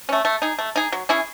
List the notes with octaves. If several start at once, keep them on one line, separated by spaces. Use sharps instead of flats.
A3 C#4
A3
D#4 G#4
A3
D#4 G#4
F#3
C#4 E4 G#4